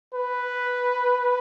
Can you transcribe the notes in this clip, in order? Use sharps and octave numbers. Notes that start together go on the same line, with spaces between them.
B4